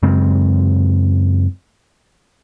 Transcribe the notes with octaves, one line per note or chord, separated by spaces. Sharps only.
F#2 C#3 G#3 C4